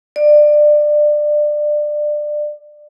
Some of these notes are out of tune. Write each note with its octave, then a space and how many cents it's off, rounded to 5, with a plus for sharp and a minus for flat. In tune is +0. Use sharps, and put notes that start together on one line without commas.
D5 +20